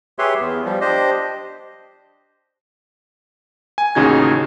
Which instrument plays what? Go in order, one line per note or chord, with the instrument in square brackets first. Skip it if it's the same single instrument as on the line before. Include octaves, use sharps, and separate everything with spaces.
[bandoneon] G4 G#4 B4 C#5 E5 C6
E2 B3
F3 G3
D4 G4 C5 D#5
[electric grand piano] G#5
A1 D#2 C#3 D#4 F#4 G#6